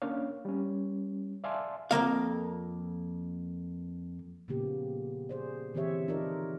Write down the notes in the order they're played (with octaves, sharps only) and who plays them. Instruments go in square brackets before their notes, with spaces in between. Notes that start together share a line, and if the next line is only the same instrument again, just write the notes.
[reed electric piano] A#3 C#4 D4 C#5 F5
G3 C#4
D5 E5 F5 G#5 A5 C6
[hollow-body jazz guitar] F2 G#2 A#3 F5
[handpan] A#2 C#3 F3 A#3 B3 G4
G#4 C5 D5
D3 E3 C4 G4 C#5 E5
F3 D#4 F4 A4 A#4 D5